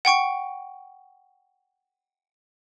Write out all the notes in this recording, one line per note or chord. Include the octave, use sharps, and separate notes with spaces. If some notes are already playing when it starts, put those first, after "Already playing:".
F#5 G5 C#6 D7